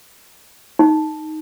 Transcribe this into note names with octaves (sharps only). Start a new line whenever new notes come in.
D#4